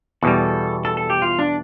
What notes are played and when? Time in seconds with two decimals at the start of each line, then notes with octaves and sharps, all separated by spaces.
0.23 E2 B2 G3 A4
0.85 A4
0.97 A4
1.10 G4
1.22 F4
1.39 D4